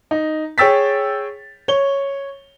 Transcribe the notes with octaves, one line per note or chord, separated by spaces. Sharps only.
D#4
G#4 C#5 G5 E6 A6 B6
C#5 G7